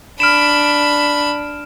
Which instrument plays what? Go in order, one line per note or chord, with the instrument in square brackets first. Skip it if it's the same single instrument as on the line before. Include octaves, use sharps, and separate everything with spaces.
[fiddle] D4 B5 [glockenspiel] F6 D7 E7